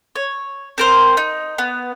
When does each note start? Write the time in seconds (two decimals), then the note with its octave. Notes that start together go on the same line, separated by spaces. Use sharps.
0.16 C#5
0.78 C4 A#4 C5
1.17 D#4
1.58 B3